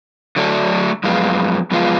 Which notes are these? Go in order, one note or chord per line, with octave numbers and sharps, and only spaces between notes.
D3 F#3 A3 D4
F#2 F3 G#3 B3 F4
F#2 F3 G#3 B3 F4